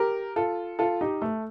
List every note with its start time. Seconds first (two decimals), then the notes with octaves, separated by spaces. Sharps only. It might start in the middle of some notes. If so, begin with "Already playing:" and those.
Already playing: G4 A#4
0.36 F4 A4
0.79 F4 A4
1.01 D#4 G4
1.22 A3